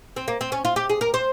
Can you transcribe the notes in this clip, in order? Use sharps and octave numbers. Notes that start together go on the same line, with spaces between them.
C4
A#3
C4
C#4
F4
G4
G#4
A#4
C5